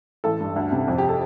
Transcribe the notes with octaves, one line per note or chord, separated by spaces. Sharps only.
A1 A4
G2
D2
C3
F2
G4
A4